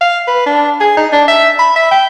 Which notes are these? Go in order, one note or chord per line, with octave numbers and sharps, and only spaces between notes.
F5
B4
D4
G#4
D#4
D4
E5
B5
E5
G5